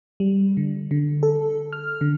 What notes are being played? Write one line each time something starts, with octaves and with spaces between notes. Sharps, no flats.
G3
D3
D3
A4
F6
D3